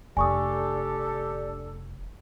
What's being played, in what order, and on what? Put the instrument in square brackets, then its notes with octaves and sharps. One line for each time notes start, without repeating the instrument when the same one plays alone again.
[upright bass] F1 [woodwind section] D4 G4 A4 [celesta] G#5 C#6 D#6